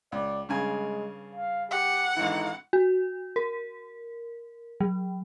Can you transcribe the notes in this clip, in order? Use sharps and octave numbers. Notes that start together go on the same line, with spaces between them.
C#2 D5
G2 C#3 G#3 G#5
F5
G4 F#5
G#1 D3 E3 D#4
F#4
A#4
F#3